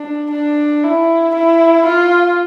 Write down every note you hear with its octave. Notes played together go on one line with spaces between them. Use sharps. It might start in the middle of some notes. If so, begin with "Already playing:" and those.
Already playing: D4
D4
E4
E4
F4